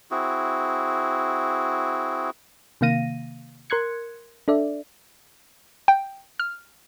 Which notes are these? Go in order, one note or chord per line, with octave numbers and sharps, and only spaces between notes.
C4 E4 F#4 G#4
C3 D#3 A#3 F5 A#6 D#7
A#4 C6 F#6 G#6 C#7
D4 A4 D5 E5
G5
F6